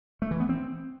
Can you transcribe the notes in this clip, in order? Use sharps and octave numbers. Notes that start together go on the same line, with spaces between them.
A3
E3
B3
C4